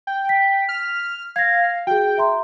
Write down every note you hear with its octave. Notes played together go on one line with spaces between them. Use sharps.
G5
B6
F6
F5 G#6 A#6
F#4 G#4 G5
E5 A#5 C6